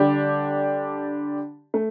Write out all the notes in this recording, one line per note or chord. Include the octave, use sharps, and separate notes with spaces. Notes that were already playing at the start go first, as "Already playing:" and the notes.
Already playing: D3 G3 D4 G4
A3